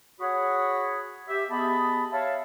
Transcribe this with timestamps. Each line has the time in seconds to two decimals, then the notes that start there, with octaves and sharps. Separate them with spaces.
0.20 F#4 G#4 C#5 F#5 B5 D#6
1.28 G4 E5
1.51 B3 G4 G#4 D#5 A5 B5
2.12 C#5 E5 F5 A5